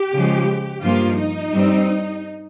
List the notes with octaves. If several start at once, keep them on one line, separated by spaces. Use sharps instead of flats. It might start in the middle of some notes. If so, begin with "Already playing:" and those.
Already playing: G4
C#3 F3 G#3
G2 F3 A#3 F4
D#4
G2 G3 C4